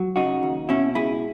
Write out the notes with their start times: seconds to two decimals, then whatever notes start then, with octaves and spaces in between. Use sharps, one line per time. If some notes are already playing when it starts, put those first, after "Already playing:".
Already playing: F#3
0.16 C#3 D#4 F#4
0.43 D#2
0.69 B2 C#4 E4
0.95 C#2 E4 G#4